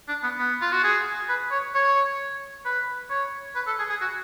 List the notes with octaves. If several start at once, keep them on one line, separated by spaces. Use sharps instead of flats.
D4
B3
B3
F4
F#4
G#4
B4
C#5
C#5
B4
C#5
B4
A4
G#4
G#4
F#4